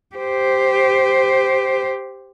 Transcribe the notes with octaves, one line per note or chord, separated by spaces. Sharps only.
G4 C5